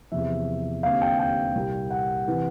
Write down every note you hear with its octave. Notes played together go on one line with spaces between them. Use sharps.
E2 C3 F3 E5
D#2 D3 G3 C4 F5
G5
G5
C2 A#2 G3 A#3
F#5
C3 E3